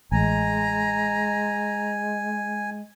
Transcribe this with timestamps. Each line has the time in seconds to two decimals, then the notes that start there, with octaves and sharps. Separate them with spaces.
0.12 A1 G#3 G#5 A#5